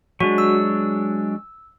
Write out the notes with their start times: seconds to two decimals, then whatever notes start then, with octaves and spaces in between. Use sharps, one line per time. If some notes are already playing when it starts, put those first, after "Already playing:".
0.20 F#3 G#3 D4 F#4
0.38 E6